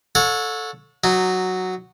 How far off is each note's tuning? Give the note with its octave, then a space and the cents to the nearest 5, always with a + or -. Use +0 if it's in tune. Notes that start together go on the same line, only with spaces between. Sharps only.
A4 +0 C#5 +0 F#5 -40
F#3 +0 D#4 -25